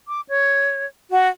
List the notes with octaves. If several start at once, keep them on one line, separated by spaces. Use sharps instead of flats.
D6
C#5
F#4